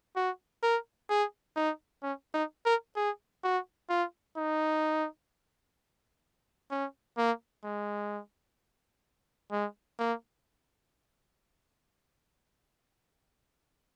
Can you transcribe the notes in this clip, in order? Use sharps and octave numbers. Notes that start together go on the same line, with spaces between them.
F#4
A#4
G#4
D#4
C#4
D#4
A#4
G#4
F#4
F4
D#4
C#4
A#3
G#3
G#3
A#3